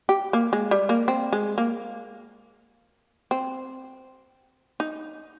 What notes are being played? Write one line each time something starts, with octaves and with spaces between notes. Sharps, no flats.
G4
A#3
G#3
G3
A#3
C4
G#3
A#3
C4
D#4